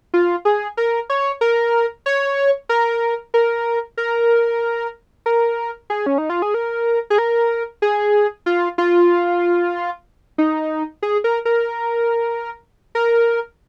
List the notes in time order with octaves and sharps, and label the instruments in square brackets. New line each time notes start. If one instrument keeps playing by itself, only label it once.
[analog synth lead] F4
G#4
A#4
C#5
A#4
C#5
A#4
A#4
A#4
A#4
G#4
C#4
D#4
F4
G#4
A#4
G#4
A#4
G#4
F4
F4
D#4
G#4
A#4
A#4
A#4